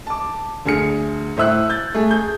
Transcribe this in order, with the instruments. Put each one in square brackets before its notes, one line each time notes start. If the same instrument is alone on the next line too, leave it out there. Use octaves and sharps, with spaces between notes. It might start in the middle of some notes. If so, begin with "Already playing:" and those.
[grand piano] A5 D6
D2 G#4 F6 C#7
A2 C5 E5 E6 F#6
G6 A6
A3 G#4
G#4 G6